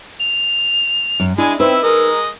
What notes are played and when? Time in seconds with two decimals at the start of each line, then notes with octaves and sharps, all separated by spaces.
0.20 F7
1.20 F#2
1.38 G#3 D4 E4 G#5
1.59 C4 D#4 E4 B4 E6
1.83 G#3 A#4 D#5